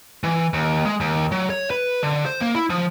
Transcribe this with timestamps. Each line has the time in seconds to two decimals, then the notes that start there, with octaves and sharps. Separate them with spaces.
0.24 E3
0.54 D#2
0.85 G#3
1.00 D#2
1.32 F#3
1.50 C#5
1.70 B4
2.03 D3
2.25 C5
2.41 A#3
2.54 E4
2.70 F3